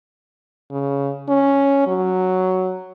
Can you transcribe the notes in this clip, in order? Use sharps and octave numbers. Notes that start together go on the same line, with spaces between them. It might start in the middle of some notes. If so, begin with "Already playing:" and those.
C#3
C#4
F#3